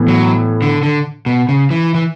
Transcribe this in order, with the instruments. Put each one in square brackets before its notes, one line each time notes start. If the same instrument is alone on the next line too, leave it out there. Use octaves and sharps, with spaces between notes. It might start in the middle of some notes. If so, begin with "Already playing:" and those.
Already playing: [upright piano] A2 E3 B3
[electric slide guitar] F#3
D3
D3
B2
C#3
E3
E3